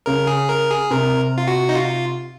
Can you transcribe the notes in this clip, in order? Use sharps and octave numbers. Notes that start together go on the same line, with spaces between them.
C#3 A#4
G#4
A#4
G#4
C3 A#4
F4
F#4
D#4
F4